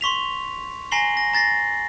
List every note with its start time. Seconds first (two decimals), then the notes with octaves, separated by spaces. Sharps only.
0.01 C6 C#6 B6 F7
0.91 G#5 A#5 A#6 C7 F#7 G7
1.17 A#6
1.33 A#5 A6 A#6 C7